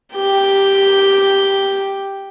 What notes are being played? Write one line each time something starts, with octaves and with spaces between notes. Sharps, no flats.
G4 G5